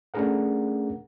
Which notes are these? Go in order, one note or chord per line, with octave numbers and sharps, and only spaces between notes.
A3 C#4 D4 G#4 A#4 F#5